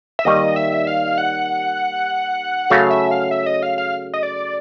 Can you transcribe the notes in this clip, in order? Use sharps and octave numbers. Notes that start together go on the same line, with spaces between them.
E5
D#2 D#3 G3 D#5
E5
F5
F#5
C#3 F#3 A3 C#4 F#4 F5
E5
F5
E5
D#5
F5
F5
D#5
D5